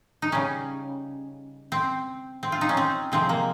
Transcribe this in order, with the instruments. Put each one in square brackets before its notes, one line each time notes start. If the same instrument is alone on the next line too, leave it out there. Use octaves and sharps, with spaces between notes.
[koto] D#4
C#3 G3 C#4
C4
C4
F4
D#4
C#4
C4
C3 F3 G#3 C4
A#3